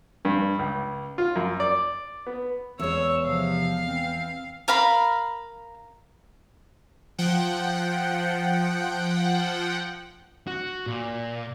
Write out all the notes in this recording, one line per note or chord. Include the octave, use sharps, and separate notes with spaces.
G2
C#2
F4
F#2
D5
B3
E2 G#3 C#5 E6
C3 F3 F5
E3 C4
A#4 F5 A#5 B5
F3 F#5 G5
F#4
A#2